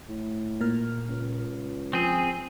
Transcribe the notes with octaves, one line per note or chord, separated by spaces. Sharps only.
A2
A#2 A#4 F6
C#2
F3 C4 G#4